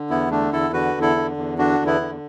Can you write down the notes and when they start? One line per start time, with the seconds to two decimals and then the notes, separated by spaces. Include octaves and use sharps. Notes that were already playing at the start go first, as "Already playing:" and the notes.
Already playing: D3
0.10 E2 B3 E4
0.31 D3 A3 D4
0.52 E2 E4 A4
0.73 D3 F#4 B4
0.95 E2
1.01 E4 A4
1.16 D3
1.37 E2
1.58 D3 D4 F#4
1.79 E2
1.86 B3 E4
2.01 D3